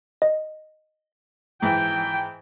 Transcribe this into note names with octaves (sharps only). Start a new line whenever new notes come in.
D#5
G#2 E3 G5